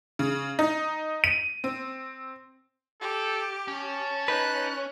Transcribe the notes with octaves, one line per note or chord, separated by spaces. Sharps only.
C#3
D#4
D#7
C4
G4 A4
C#4 A5
D#4 B4 F#6